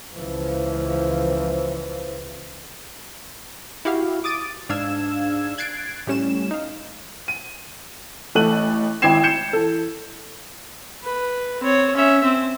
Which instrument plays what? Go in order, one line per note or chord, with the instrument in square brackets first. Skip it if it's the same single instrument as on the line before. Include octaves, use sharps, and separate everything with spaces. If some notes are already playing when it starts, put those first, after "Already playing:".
[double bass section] C#2 E3 F3
[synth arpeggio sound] E4 F#4 G4 F5
D6 D#6 A6 D7 D#7
G#2 D4 F5 E6 G#6 E7
F#6 G#6 A6 C7 D7
A2 G3 C#4 E7
D#4 F5
[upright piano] D#7
A1 A3 A4 F#6 D#7 F#7
G#1 E4 G5 G#6 C7 E7
G6 C#7 E7
E3 A4
[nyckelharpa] B4
C4 C#5
C#4 E5
C4